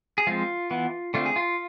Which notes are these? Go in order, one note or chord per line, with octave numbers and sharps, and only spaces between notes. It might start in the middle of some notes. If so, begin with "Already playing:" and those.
G#4
F3 G#3 C4 F4
E3 B3
D3 A3 C4 F4
G#4
F4